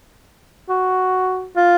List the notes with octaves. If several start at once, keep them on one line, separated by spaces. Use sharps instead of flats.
F#4
F4